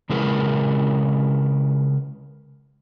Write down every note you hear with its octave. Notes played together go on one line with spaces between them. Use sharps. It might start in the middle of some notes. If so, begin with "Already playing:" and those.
C#3 G#3 E4 G#4 A#4 B4